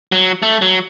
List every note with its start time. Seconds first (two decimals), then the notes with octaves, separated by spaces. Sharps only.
0.12 F#3
0.42 A3
0.62 F#3